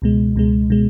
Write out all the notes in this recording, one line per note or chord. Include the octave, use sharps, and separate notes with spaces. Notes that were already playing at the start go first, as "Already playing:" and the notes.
C#2 B2 G#3
C#2 B2 G#3
B2 G#3